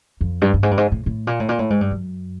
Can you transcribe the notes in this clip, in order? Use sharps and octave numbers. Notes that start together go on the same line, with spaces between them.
F2
G2
G2
G#2
G2
G#2
A2
A2
A#2
A2
A#2
A2
G#2
G2
F#2